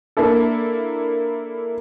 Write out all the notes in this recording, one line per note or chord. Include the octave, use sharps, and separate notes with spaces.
A#3 D4 E4 A4